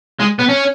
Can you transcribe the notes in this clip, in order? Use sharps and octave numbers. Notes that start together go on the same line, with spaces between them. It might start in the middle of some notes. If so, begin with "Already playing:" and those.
G#3
B3
C#4